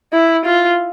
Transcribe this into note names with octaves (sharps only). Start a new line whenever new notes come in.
E4
F4